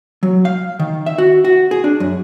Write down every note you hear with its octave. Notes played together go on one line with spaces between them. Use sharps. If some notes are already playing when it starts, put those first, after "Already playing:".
F#3
F5
D#3
E5
F#4
F#4
G#4
D4
F#2